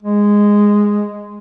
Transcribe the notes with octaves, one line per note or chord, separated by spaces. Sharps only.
G#3